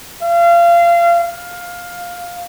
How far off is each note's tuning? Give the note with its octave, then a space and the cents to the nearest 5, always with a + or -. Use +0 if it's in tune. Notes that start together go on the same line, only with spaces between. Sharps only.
F5 -30
F5 +15